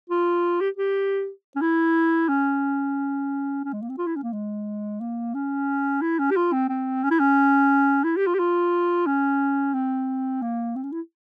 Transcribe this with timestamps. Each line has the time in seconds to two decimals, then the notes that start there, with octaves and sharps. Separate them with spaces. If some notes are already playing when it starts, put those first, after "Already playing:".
0.10 F4
0.60 G4
0.77 G4
1.56 C#4
1.61 E4
2.29 C#4
3.65 C#4
3.73 G#3
3.82 A#3
3.89 C4
3.98 F4
4.07 E4
4.16 C#4
4.23 A#3
4.33 G#3
5.01 A#3
5.34 C#4
6.01 E4
6.19 C#4
6.31 G4
6.36 F4
6.53 C4
6.69 C4
7.03 C#4
7.11 E4
7.19 C#4
8.04 E4
8.17 G4
8.27 F4
8.34 G4
8.39 F4
9.06 C#4
9.74 C4
10.42 A#3
10.76 C4
10.83 C#4
10.92 E4